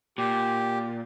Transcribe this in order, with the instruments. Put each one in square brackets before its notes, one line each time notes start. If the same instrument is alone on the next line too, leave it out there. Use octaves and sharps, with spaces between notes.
[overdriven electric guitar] A#2 [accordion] G4